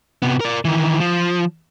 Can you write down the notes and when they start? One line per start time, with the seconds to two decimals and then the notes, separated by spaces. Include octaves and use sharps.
0.22 C3 B3
0.41 A#4 D5
0.65 D#3 E3
1.00 F3